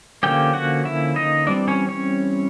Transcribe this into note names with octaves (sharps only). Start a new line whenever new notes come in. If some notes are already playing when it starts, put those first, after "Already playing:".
D3 F3 A#3 C#4 G4 G5
F#4 F#5
E4 E5
D#4 D#5
E3 G3 C4 D4 D5
C#4 C#5
C#4 C#5